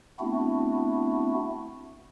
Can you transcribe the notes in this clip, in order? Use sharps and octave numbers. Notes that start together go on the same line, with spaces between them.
A3 B3 C4 D4 E4 F#4